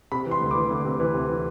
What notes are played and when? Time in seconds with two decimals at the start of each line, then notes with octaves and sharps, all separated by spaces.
0.12 C3 B5
0.26 E3
0.31 C6
0.41 D2
0.51 E3 D6
0.70 D2
0.85 C3
1.00 E3
1.14 C3
1.29 E3